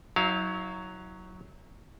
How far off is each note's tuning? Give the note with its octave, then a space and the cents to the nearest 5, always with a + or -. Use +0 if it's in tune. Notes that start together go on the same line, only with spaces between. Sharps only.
F#3 +0 E4 -40 F5 +0